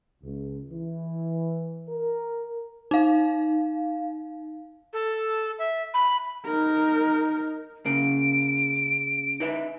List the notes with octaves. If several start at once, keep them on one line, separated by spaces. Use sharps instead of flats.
C#2
E3
A#4
D#4 F5
A4
E5
B5
D#4 A#4
C#3 A#3 D7
D#4 B4 E5